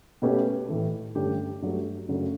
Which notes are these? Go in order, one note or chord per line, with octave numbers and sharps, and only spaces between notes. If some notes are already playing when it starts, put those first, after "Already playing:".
B2 A3 C#4 G4 B4
A2 E3 A3
G2 D3 A3 C#4 G4
G2 F#3 A3
F#2 C#3 F#3 A3 D4